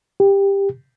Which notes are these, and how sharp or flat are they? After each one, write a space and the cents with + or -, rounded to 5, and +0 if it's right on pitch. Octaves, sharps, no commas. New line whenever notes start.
G4 +15